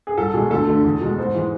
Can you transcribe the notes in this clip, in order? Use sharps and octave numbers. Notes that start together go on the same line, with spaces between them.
G#4
C2 A4
B2 G#3 G#4
D2 A4
D3 A3
E2
B2 G#3
G#2 C5
E3 G#3